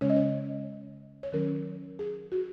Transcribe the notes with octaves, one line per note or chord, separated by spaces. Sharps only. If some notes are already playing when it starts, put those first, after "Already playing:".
C#3 G#3 C#4 C#5
D#5
C#5
C#5
D#3 F#3 C#4 A#4
G#4
F#4